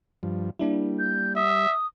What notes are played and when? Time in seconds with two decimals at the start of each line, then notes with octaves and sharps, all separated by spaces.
0.23 G2 F3
0.59 G3 A#3 D4 E4
0.99 G6
1.36 E5 D#6